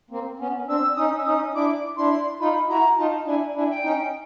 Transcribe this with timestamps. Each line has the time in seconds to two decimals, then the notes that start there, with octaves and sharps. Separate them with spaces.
0.10 A#3 C4
0.39 B3 C#4
0.67 C4 D4 E6
0.96 C#4 D#4 D#6
1.18 E6
1.25 C#4 D#4 D#6
1.54 D4 E4 D6
1.96 D4 E4 C6
2.40 D#4 F4 B5
2.69 E4 F#4 A#5
2.97 D#4 F4 A5
3.26 D4 E4 G#5
3.55 D4 E4 G#5
3.70 G5
3.83 C#4 D#4